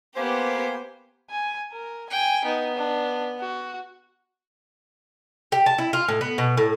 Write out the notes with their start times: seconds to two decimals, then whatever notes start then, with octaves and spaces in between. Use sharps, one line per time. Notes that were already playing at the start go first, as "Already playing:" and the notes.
0.16 A#3 B3 G4 C5 G#5
1.30 G#5
1.73 A#4
2.10 G5 G#5
2.45 B3 D#4
2.76 D4
3.40 F#4
5.52 G4
5.66 A5
5.78 E4
5.93 F4
6.08 A2
6.21 B3
6.38 B2
6.57 A2